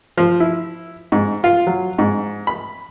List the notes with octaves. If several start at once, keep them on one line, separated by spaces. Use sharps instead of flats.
F3
E4
G#2
F4
F#3
G#2
B5